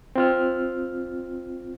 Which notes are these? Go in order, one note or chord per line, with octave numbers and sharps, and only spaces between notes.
C4 F4 F6